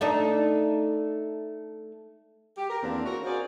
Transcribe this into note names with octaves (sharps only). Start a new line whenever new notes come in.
A3 D4 D#4
G4
A#4
E2 A#3 C4 D4
C#4 F4 F#4 A#4
F#4 G#4 A#4 C5 D5